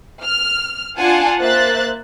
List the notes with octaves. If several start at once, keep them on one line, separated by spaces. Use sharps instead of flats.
F6
D4 F4 F#5 G#5 A5
A#3 C5 E5 F#6 A6